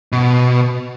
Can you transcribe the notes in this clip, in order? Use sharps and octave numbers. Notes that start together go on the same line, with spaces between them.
B2